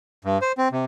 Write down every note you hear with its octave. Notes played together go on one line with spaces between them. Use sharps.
G2
C5
C4
C3